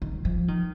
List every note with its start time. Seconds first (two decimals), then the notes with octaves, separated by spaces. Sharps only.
0.02 D#3
0.25 F3
0.48 D#3